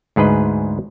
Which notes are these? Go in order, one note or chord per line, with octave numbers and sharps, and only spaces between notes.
D2 G#2 G#4 B4 D#5